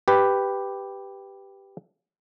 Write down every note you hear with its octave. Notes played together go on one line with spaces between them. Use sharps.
G4 B4